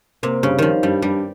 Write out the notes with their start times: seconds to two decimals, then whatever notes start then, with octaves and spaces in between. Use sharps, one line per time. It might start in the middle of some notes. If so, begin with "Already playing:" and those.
0.23 C3 A#3
0.43 G2 C#3
0.58 D#3 F3 G3
0.83 G2 G3
1.02 G2 G3